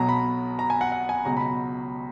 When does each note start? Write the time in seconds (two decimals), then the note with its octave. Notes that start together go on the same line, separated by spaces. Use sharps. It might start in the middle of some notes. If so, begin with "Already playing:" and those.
Already playing: B1 B2 F#3 A#5
0.09 B5
0.59 A#5
0.70 G#5
0.81 F#5
0.92 F#5
1.09 G#5
1.25 C#2 B2 F#3 A#5
1.37 B5